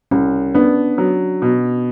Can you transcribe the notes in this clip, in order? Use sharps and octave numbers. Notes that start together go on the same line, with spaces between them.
C2 C#4
B3 D4
F#3
B2